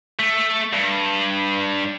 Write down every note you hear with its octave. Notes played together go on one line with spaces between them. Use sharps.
A3
G2